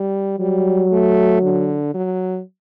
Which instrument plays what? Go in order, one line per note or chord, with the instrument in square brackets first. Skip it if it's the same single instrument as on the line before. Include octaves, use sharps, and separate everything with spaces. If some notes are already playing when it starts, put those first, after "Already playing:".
Already playing: [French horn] G3
[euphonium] F#3 [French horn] G3
[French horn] A3
D3
F#3